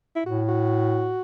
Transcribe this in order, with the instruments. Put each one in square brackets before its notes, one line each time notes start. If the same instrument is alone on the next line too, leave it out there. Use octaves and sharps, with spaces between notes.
[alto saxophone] E4
[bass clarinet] A2 [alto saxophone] F#4
[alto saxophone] F#4